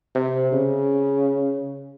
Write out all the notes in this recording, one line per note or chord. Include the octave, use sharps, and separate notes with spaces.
C3
C#3